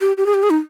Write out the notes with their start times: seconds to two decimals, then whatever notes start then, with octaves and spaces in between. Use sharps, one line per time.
0.01 G4
0.17 G4
0.26 G#4
0.34 G4
0.43 G#4
0.50 D#4